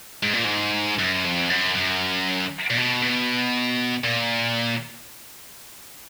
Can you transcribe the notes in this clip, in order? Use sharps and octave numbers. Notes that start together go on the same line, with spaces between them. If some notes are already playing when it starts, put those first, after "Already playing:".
G#2
A#2
G#2
F#2
F2
F#2
F#2
A#2
B2
B2
A#2